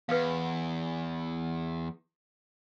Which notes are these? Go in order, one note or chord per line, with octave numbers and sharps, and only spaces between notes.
E2 B4 F5